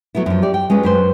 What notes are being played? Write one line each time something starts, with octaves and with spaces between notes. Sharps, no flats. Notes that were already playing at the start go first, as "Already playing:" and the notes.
F#3 A3 B3 E4
F#2 F3
G4 D5
G5
G#3 C#4 F4 B4
F#2 B4 C5